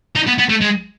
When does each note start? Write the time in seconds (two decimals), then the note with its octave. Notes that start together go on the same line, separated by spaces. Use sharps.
0.16 D#4
0.28 B3
0.39 B3
0.50 A3
0.62 G#3